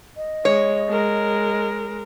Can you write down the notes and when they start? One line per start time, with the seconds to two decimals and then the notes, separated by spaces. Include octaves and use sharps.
0.17 D#5
0.45 G#3 C#5
0.89 G#3 A#4